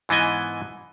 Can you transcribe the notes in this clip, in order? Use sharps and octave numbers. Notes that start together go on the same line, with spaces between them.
G#2 E3 B3 D#5 G#5